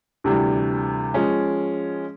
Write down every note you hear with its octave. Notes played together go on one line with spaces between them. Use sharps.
D2 C3 E3 G3
F3 G#3 C#4